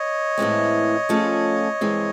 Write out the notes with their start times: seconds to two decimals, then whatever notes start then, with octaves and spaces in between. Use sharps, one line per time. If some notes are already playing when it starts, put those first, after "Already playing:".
Already playing: C#5 D#5
0.38 A2 E3 G#3 C4
1.09 F3 A3 C#4 F4 G#4
1.81 G2 E3 G#3 C4